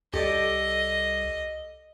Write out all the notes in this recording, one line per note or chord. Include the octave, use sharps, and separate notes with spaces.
C2 G4 A4 D5 D#5